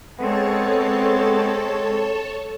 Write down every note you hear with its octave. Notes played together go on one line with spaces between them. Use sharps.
G#3 B3 C4 G#4 A4 C#5 A5